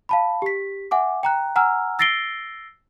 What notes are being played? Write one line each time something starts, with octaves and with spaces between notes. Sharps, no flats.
F5 A5 B5
G4 B6
E5 F#5 G#5 D6
G5 A#5 F#6
F#5 G#5 A#5 E6 F6
E6 A6 A#6 C7 D7 G7